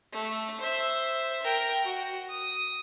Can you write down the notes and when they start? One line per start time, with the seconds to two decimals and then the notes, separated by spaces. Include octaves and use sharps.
0.12 A3
0.60 C5 E5
1.42 A#4 G5
1.85 F#4
2.29 D#6